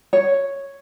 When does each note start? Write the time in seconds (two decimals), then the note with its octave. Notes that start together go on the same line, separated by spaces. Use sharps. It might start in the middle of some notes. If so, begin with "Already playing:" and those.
0.13 C#5